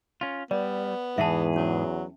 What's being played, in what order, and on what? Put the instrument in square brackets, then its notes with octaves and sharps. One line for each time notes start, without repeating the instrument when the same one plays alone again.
[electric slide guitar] C#4 F4
[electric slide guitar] G3 [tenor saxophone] B3 [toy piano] D5
[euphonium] E2 [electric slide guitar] G#2 E3 G#4 [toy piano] E5 A5
[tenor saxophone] F#3 [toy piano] C#4